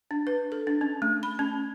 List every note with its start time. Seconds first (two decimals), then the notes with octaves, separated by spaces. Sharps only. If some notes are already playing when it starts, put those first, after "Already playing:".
0.11 D4
0.27 B4
0.52 A4
0.67 D4
0.81 C#4
1.02 A3
1.23 B5
1.39 C#4